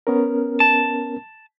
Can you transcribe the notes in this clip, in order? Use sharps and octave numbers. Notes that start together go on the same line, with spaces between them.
B3 C#4 A#4
A5